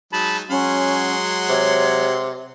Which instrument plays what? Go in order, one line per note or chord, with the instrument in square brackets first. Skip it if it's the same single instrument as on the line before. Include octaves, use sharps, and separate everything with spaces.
[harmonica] F#3 G#3 D#4 [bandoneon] A5 B5
[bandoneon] F#3 [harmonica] G#3 F#5 C6 [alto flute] C#4
[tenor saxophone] C3 [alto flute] C#5